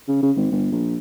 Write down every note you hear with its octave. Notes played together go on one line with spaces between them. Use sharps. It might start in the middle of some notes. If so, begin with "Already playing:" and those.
C#3
C#3
G#1
G1
A#1